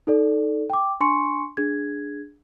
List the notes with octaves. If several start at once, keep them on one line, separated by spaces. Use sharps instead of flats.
D#4 A4 D5
G5 D6
D4 G#5 C6 C#6 C#7
D4 G#4 G#6